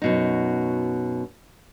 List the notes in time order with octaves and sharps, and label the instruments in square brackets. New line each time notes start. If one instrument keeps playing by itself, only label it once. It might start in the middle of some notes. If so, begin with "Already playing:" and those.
[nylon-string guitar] F#2 B2 D#4